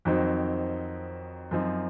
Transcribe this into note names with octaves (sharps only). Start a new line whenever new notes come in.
F2 D#3 F#3 C4 D#4
F#2 F3 C4 D#4